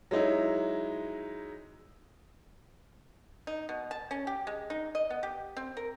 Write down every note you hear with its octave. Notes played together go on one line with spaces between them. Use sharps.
F#3 G#3 D#4 E4
D#4
B2
A5
C#4
G4
G#3
D#4
D#5
B3
G4
C4
A#4